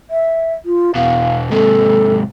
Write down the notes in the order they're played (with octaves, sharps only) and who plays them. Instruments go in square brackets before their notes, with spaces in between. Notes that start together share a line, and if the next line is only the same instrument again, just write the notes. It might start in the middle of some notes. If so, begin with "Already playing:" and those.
[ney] E5
F4
[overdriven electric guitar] E2 B2 [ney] F5
[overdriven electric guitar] G#2 C3 [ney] A4